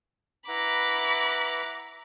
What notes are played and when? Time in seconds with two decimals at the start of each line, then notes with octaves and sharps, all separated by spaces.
0.48 E4 B4 F#5 A#5 B5 D6